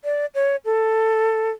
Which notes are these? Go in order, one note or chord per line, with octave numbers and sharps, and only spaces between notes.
D5
C#5
A4